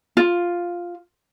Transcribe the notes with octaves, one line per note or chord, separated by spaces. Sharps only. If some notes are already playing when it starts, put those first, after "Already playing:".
F4